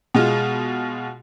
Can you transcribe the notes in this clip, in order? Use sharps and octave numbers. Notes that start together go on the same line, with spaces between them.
B2 G#3 F4